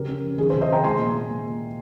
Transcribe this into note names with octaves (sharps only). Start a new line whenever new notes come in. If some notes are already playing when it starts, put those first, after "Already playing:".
Already playing: C#3 G4 A#4
C#4
F2
D#3 G#4
C3 G#4 C5
C5 D#5
C3 G5 A#5
G#3 G#5 C6
A#2
A#2